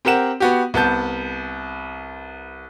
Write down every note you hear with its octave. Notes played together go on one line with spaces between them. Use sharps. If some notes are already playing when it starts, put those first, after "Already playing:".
C4 G4 A#4 F#5 E7
B3 F#4 G4
C2 B3 A5 G6